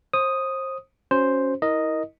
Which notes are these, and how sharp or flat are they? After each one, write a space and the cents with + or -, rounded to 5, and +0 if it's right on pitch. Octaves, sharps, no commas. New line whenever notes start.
C5 +30 D#6 +0
C#4 +0 F#4 +0 C5 +0
E4 -35 A#4 +0 D#5 +0